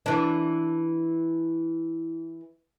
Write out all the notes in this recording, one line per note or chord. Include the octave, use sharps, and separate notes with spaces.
E3 D4